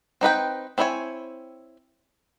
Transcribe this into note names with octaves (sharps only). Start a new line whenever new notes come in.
C4 D#4 B4 G5
C4 D4 E4 C#5 G#5